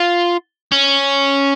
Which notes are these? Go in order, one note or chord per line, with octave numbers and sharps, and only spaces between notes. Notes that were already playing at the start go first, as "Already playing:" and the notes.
Already playing: F4
C#4